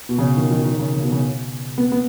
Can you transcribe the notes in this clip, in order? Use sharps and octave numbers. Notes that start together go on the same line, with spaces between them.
B2
C#3
D#3
D#3
D#3
C#3
C#3
B2
C#3
B3
B3